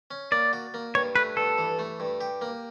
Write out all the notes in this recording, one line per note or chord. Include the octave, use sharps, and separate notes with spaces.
C#4
A#3 D5
F#4
A#3
G2 C#5
A3 B4
G2 A4
E3
A3
G2
G4
A#3